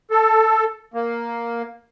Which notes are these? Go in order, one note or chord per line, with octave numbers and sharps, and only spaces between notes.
A4
A#3